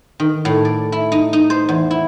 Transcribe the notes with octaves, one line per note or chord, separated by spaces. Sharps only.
D#3
A2
D5
E4
D#4
D#4
C5
E2
E4